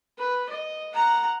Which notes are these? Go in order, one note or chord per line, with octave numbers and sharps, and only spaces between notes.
B4
D#5
F#5 A#5